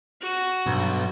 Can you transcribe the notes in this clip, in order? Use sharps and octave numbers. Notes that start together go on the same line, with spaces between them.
F#4
B1 G2